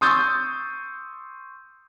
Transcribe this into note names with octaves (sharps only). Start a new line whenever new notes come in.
C6 C#6 D#6 E6 G6 A6